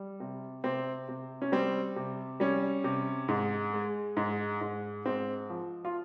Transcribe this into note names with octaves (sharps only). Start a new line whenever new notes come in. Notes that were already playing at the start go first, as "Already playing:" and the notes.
Already playing: G3
C3
C3 C4
C3
C#4
G3 C4
C3
G3 C#4
C3
G#2
G#3
G#2
G#2
G#2 C4
F3
F4